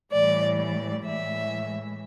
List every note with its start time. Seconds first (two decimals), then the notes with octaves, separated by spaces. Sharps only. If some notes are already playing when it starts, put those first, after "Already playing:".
0.13 A2 E3 G3 D5
0.59 D5
1.05 A2 E3 G#3 E5